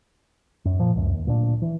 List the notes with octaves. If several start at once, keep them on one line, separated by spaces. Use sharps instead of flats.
F#2
A#2 F3
C#2 F#2
D#2
D1 A#2 D4
E3